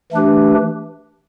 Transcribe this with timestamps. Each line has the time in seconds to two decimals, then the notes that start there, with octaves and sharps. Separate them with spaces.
0.12 E3 A3 D4 G4 B4